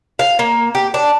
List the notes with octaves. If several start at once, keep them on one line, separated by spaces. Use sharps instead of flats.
F5
A#3
G4
D4